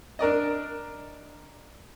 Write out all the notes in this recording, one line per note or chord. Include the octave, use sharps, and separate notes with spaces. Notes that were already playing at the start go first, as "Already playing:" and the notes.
D4 A#4 D5 D#5